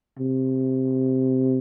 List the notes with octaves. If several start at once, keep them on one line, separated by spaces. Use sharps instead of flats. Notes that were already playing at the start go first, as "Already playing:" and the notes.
C3